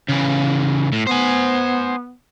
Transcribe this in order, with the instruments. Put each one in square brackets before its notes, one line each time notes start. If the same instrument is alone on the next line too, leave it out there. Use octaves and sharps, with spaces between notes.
[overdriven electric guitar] C#3 E3
A2
[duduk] B3 [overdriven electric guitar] C5 G#5